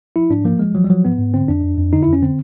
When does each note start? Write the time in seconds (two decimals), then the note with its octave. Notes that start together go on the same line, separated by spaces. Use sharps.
0.16 F3 E4
0.30 G#2 D4
0.45 F3 A#3
0.59 F3 G#3
0.75 F3 F#3
0.84 G3
0.90 F3 F#3
1.05 G#2 B3
1.19 G#2
1.34 D3 C4
1.48 F2 D4
1.63 F2
1.78 F2
1.93 D3 D#4
2.03 E4
2.08 F2
2.13 C#4
2.22 D3 C4